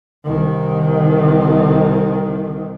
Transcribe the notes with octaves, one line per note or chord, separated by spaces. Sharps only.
C2 D#3